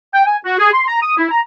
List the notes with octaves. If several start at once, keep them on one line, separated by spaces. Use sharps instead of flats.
G5
G#5
F#4
G#4
C6
A#5
D#6
E4
A#5